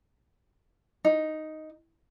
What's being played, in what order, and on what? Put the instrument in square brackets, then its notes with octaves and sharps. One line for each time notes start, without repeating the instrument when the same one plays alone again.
[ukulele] D#4